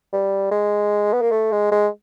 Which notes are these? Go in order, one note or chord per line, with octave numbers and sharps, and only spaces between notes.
G3
G#3
B3
A#3
A3
G#3
G#3